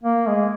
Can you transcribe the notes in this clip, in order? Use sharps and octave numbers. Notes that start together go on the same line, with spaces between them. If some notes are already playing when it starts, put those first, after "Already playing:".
A#3
G#3